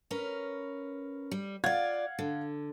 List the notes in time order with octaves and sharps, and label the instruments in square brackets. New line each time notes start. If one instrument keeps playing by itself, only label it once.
[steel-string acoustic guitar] C#4 A#4 B4
G3
[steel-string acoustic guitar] F4 D5 [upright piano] F5 F#5 G#6
[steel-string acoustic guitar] D3